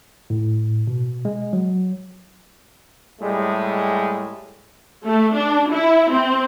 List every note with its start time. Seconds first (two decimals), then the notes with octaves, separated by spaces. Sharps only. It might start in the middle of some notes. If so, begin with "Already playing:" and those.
0.30 A2
0.87 B2
1.25 G#3
1.53 F#3
3.22 A2 G3 G#3
5.05 A3
5.36 D4
5.70 E4
6.12 C4